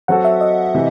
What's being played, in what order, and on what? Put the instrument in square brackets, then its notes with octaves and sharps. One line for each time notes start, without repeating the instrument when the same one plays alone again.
[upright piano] F#3 C4 F#4 A4 [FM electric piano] F#5
[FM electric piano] E5
D#5
[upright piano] C3 E3